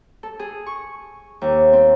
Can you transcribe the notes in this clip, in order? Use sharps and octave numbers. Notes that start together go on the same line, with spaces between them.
A4
G#4
C#6
D#2
C4